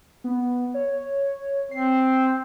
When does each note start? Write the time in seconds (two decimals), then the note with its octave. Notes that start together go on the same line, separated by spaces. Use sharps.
0.24 B3
0.74 C#5
1.71 C4 C7